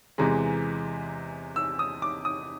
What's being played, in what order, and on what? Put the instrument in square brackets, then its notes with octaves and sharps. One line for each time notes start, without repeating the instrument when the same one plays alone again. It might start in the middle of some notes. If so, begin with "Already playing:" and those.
[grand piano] E2 C3 E3 G#3 A#5
E6
D#6
D6
D#6